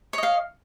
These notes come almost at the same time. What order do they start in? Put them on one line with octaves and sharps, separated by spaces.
C#5 D#5 F5